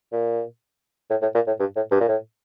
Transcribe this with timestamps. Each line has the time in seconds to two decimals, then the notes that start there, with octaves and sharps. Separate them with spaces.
0.12 A#2
1.10 A2
1.22 A2
1.35 A#2
1.47 A2
1.60 G2
1.76 A2
1.91 G2
2.00 A#2
2.08 A2